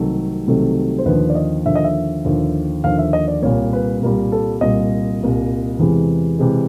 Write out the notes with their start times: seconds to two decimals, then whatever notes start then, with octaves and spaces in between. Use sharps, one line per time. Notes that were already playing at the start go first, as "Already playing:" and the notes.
Already playing: C2 C3 D#3 F#3 A3 A4
0.47 C2 C3 D#3 F#3 A3
0.98 C5
1.06 D#2 D3 F3 B4
1.30 D5
1.35 D#5
1.66 D#2 D3 F3 E5
1.76 D#5
1.84 E5
2.25 D#2 D3 F3
2.84 D#2 D3 F3 F5
2.98 E5
3.13 D#5
3.28 D5
3.42 C2 A#2 G3 C#5
3.73 B4
4.01 C2 A#2 G3 A#4
4.32 A4
4.61 C2 A#2 G3 D#5
5.21 C2 A#2 G3
5.79 E2 C3 E3 G#3
6.39 C3 E3 G#3